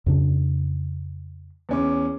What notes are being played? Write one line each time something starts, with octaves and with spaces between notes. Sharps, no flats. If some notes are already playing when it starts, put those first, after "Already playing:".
F2 C#3 D4
E2 C#4 D6